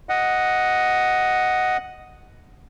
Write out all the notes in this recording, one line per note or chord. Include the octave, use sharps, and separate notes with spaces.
D#5 F#5